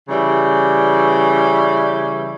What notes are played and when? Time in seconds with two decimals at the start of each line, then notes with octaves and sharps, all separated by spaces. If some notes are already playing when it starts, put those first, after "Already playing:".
0.08 C#3 E3 G3